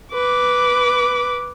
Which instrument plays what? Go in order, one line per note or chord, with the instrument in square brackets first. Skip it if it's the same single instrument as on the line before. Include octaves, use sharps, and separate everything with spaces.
[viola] B4 D6